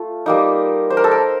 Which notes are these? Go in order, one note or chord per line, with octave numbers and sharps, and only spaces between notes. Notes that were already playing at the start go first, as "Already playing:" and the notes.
Already playing: A3 F4
G3 A#3 D#4
C5
A#4
A4
A#4